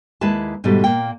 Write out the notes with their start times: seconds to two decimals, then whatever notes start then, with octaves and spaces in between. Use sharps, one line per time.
0.21 D#2 G#3 A#3 E4 B4 A5
0.64 G#2 B2 D#3 G3 A3
0.84 A#2 A#3 G5